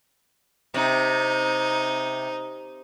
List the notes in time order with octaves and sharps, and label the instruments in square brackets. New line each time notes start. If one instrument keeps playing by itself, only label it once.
[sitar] C3 [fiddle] D#4